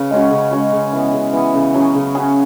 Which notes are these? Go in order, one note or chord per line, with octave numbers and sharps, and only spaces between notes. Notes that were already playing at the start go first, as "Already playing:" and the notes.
Already playing: C#3 B4
G#3 C#4 F#4
C#3
G#3 C#4 F#4
C#3
E3 B3
C#3
E3 B3
C#3
F#3 C#4 G#4
C#3
F#3 C#4 G#4